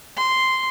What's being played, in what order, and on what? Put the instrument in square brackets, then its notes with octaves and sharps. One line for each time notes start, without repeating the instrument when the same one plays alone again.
[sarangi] C6